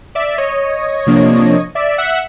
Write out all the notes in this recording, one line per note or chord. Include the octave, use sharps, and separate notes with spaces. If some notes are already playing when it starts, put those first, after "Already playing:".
D5 E5
C#5 D#5
C3 F3 A#3 D4
D5 E5
E5 F#5